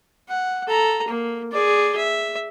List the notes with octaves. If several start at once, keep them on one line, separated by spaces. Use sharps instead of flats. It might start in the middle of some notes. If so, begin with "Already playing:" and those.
F#5
A4 A#5
A#3
G#4 D5
E5